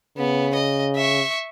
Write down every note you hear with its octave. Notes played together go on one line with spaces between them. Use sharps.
C#3 B3
D#5
E5 C#6